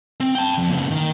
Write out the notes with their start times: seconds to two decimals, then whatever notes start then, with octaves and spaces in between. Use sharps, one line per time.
0.20 C4
0.35 G5 A5
0.58 F2
0.70 A#2 C#3
0.91 D#3